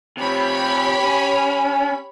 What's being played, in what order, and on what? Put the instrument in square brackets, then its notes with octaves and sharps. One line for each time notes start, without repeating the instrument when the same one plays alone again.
[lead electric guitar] C3 F3 [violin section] G4 C#5 B5
[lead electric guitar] C#4